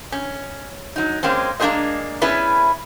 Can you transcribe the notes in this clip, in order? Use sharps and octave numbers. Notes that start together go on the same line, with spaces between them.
C#4
F#3 D#4
G#3 A#3 C4 C#4
G#3 A#3 D4 G#4 C5 D#5
B3 C#4 E4 G#4 B4